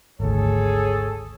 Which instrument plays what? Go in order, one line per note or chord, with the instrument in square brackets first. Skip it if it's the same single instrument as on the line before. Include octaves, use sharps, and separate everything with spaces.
[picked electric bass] G#1 D2 [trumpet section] G#4 A4 C#5